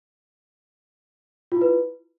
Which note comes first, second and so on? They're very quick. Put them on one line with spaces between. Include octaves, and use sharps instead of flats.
F4 E4 B4